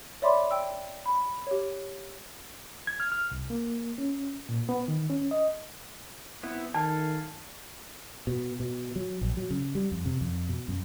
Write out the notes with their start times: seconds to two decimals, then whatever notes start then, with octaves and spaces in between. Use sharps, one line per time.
0.22 C#5 D5 E5 B5 C6 D6
0.51 G5 E6
1.06 B5
1.47 G4 C#5
2.87 G#6
3.00 F6
3.12 F6
3.31 C2
3.50 A#3
3.98 C#4
4.49 A#2
4.69 B3
4.88 D#3
5.10 C#4
5.31 D#5
6.43 B3 C4 E4
6.74 D#3 A4 F5 G#5 A5
8.27 B2
8.60 B2
8.96 F#3
9.21 A#1
9.37 F#3
9.50 C#3
9.75 G3
9.92 F2
10.06 C3
10.21 F2
10.49 B2
10.68 F#2